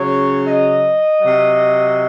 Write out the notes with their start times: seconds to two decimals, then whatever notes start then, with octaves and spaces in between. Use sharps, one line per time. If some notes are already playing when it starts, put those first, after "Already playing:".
Already playing: C#3 F#3 C#5
0.48 D#5
1.21 C3 F#3